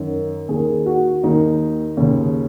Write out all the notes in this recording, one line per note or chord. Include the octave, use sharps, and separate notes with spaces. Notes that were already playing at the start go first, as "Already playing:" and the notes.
Already playing: F#2 D#3 D#4
D#2 D#3 G#4
F#4
D#2 D#3 D#4
D#2 C#3